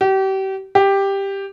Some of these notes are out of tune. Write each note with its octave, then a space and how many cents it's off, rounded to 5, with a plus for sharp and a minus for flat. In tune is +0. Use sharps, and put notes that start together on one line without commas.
G4 -35
G4 +5